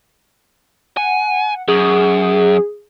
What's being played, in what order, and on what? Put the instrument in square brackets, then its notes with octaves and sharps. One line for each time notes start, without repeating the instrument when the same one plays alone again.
[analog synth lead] F#5 [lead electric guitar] G#5
[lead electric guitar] F#2 [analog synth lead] G#4